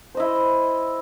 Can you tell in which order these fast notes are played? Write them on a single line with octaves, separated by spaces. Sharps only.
C5 D#5 E4